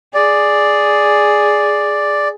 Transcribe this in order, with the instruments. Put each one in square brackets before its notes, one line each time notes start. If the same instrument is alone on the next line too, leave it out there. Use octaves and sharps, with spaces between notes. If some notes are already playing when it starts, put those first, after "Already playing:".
[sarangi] G#4 [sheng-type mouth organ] D5